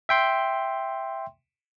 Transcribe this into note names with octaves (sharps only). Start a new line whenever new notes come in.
E5 G5 C6